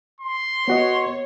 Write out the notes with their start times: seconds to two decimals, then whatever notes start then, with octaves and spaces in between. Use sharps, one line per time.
0.21 C6
0.68 B3 F#4 C#5 D#5